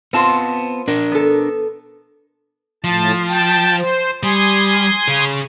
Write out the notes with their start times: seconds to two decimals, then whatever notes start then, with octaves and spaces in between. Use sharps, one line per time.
0.13 B3 C4 F4 C5 A5
0.88 D4 A#4
1.12 B3 A4
2.84 A2 F3 A5
3.28 G5 A5
3.76 C5
4.23 G3 G#5 C6 D#6
5.08 C#3 G#4